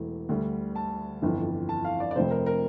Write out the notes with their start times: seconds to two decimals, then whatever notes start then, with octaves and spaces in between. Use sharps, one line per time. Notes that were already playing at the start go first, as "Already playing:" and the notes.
Already playing: E1 E2 E3 A3
0.29 D2 D3 G3
0.76 A5
1.22 G1 F2 E3
1.69 A5
1.85 F5
2.00 D5
2.11 D5
2.16 F1 F2 C3 C5
2.31 A#4
2.46 A#4